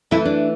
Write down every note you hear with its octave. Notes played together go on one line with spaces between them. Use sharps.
E3 A3 E4
D4